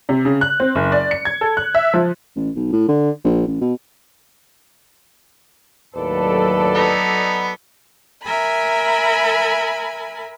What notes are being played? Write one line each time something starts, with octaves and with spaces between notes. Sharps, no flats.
C3
C#3
F#6
C4
F#1
D5
C#7
G#6
A4
F#6
E5
F3
A1
B1
A2
D3
A#1
A1
B2
D#2 A2 F#3 A4 B4 D5
B3 D#4
A#4 E5 G#5 B5